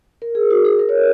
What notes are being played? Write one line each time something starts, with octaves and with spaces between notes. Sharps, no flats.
A#4
G#4
F#4
G#4
A#4
C#5